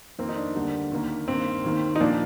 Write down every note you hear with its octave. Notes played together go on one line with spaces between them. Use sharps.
F2 D#3 A#3 C4
D#4
D4
D2 D3 G3 A#3
D#2 D#3 A#3
G2 D#3 A#3 C4
D#2 D#3 A#3
D#4
A#2 F3 A#3 D4